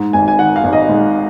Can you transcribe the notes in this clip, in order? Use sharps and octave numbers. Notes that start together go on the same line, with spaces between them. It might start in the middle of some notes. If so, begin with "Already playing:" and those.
Already playing: G#2
G#1 G#5
G#5
D#3 F#5
F5
G#1
D#5
G#2